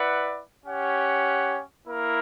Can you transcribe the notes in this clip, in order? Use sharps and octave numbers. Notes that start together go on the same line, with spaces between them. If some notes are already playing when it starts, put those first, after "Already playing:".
Already playing: E4 B4 D5 F#5
C#4 G4 C#5 F#5
A#3 E4 A#4